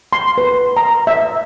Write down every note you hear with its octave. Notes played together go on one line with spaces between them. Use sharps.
C6
B4
A#5
E5